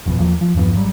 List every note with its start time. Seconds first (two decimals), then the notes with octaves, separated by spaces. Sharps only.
0.06 F#1 F2 B2
0.19 E2 F3 A#3
0.41 F3
0.55 E2 G2 F3 B3
0.73 G#1 F#3 G3